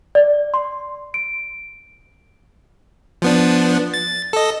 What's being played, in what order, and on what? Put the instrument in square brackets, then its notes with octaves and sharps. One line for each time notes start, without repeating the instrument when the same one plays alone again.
[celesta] D5
C6
D7
[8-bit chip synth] F3 B3 D4
A6
A4 D#5